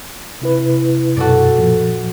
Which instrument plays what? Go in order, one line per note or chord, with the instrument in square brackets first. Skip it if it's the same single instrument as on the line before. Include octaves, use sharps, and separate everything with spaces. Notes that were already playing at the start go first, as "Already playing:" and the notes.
[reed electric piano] C3 E4 B4
[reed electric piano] F#2 B2 [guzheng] F#4 A4 D5
[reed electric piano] A#2 F3